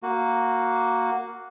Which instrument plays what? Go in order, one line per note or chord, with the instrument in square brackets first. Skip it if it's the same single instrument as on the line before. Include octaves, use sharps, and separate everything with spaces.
[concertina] A#3 F#4